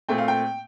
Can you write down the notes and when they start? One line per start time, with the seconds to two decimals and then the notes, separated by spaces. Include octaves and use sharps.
0.08 A#2 A3 C4 G5
0.18 F5
0.28 G5